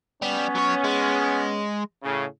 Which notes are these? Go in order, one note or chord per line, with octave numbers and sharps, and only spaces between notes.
G3 B3 C#4
F#3 C#5
G#3
A2 C#3